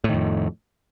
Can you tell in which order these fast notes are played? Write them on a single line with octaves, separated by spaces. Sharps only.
A2 D#3 F2